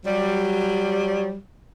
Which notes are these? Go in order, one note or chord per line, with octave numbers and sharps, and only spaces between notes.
F#3 G3